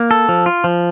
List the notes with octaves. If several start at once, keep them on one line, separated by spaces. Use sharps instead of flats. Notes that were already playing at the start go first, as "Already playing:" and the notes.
Already playing: A#3
A4
F3
F4
F3